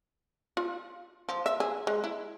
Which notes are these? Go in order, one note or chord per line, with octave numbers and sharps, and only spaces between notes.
F4
F3
E5
G#4
G#3
E4